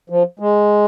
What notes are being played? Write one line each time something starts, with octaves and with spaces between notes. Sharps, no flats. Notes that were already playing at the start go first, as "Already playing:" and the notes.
F3
G#3